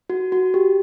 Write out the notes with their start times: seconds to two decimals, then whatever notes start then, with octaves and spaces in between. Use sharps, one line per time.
0.10 F#4
0.32 F#4
0.54 G4